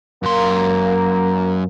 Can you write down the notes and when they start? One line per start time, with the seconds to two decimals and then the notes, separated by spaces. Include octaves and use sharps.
0.23 F#2 A#3 C6